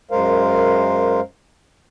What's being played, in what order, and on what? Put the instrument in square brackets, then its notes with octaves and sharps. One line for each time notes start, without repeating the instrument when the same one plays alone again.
[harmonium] F#2 G#3 A#4 C5 F5